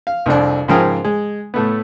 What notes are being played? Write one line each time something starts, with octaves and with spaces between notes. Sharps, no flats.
F5
C2 F2 C4 D4
G#2 C#3 F3 A#4 G5 D#6
G#3
A2 A3 B3